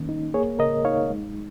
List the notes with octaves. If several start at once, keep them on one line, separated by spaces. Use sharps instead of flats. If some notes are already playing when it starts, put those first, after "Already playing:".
Already playing: D#3 A#3 C#4
D#4
A#3 G#4 C#5
C#3 A#4 D#5
D#4 C#5 F5
G#3